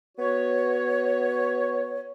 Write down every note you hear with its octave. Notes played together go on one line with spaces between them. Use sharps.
B3 F#4 C#5